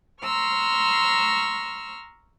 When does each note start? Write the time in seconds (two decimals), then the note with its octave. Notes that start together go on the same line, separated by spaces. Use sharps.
0.22 A#5 C6 C#6 E6 F6